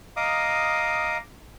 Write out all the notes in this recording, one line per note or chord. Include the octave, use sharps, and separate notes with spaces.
D#5 F5 A#5 D6 D#6